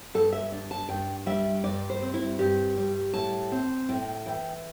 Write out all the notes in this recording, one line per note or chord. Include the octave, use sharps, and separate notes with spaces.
G2 A4
E5
D4
A5
G2 G5
G3 E5
G2 D5
C5
C4
E4
G2 G4
G3
A2 A5
C4
A2 G5
E3 G5